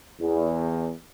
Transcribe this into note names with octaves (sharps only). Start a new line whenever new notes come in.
E2